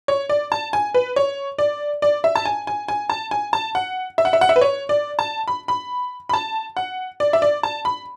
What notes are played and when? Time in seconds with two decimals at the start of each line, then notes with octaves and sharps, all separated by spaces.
0.08 C#5
0.29 D5
0.52 A5
0.73 G#5
0.94 B4
1.16 C#5
1.58 D5
2.02 D5
2.24 E5
2.35 A5
2.45 G#5
2.67 G#5
2.88 G#5
3.10 A5
3.31 G#5
3.53 A5
3.75 F#5
4.18 E5
4.25 F#5
4.33 E5
4.41 F#5
4.49 E5
4.56 B4
4.61 C#5
4.89 D5
5.19 A5
5.48 B5
5.68 B5
6.29 B5
6.34 A5
6.77 F#5
7.20 D5
7.33 E5
7.42 D5
7.63 A5
7.85 B5